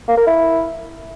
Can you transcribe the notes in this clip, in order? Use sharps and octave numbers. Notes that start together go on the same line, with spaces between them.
A#3
A#4
E4